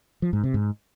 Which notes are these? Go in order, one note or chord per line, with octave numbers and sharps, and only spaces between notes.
F3
G#2
C3
G#2